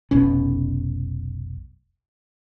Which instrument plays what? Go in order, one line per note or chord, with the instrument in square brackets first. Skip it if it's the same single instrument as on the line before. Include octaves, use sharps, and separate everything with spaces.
[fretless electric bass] F1 B1 B2 C#4